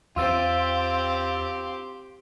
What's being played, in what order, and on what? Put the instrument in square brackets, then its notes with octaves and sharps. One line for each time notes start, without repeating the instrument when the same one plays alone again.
[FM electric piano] E2 E6 A6 [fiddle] C4 G4 [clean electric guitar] F4